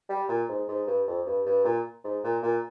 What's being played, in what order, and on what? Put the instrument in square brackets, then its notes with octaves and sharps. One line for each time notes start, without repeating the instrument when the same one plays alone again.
[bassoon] G3
A#2
G#2
G#2
G2
F2
G2
G2
A#2
G#2
A#2
A#2